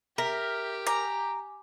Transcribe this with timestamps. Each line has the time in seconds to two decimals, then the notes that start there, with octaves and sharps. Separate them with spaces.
0.18 G4 A#4 E5 A#6 B6
0.87 G#5 A#5 D6